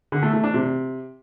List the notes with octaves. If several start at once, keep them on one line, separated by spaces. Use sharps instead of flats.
D3
A3
A3
D4
C3